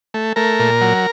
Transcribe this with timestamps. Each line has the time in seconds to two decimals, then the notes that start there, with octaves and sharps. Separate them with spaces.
0.14 A3
0.36 A3 A#4
0.60 A#2
0.81 F#3